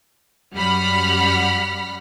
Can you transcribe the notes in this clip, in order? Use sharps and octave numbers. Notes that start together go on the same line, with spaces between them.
F#2 G3 F#5 B5 F6 B6